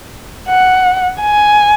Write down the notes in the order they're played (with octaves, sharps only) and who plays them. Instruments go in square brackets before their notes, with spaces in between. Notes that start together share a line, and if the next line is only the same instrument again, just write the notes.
[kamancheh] F#5
G#5